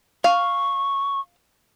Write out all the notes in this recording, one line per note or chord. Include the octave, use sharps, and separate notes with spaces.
F5 C#6